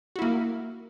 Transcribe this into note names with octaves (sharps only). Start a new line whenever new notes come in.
A#3 E4 F#4